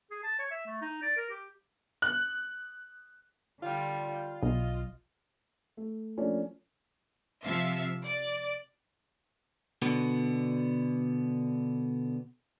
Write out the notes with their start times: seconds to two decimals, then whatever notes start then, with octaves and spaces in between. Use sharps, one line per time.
0.11 G#4
0.23 A5
0.39 C#5
0.51 E5
0.66 A3
0.81 D#4
1.02 D5
1.17 A#4
1.30 G4
2.02 F#6
3.62 D3 G3 F4
4.43 B1 D#5
5.77 A3
6.17 F3 A3 A#3 C#4 D4 F4
7.44 C3 F3 E5 F5
8.04 D5
9.82 B2 D3 B3